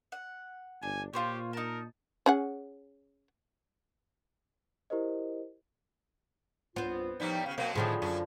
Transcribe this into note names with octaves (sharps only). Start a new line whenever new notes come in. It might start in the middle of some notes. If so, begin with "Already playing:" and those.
F#5
G1 D4 G#5
A#2 F4 G4 C5 C#5
D#4 A#4 A5
C#4 G#4 F#5
E4 G4 A#4 C5 D#5
C2 G2 B3 C4 F4 C5
A2 F3 G3 A#3 D#4
C#3 F#4 F5
B2 F3 F#3 A#3 C4
A2 D3 D#3 F3 E4 G#4
F#2 F#3 C#4